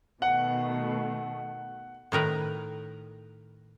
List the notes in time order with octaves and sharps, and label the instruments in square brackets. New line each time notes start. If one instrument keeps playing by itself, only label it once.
[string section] B2 D#3 A3 [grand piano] F#5
[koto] A2 D#3 A#4 B4